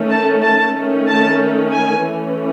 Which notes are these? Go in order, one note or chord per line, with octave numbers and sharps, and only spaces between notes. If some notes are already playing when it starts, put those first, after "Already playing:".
Already playing: D#3 A3 C#4
A5
A5
D#3 A3 C#4
A5
G#5
E3 A3 C#4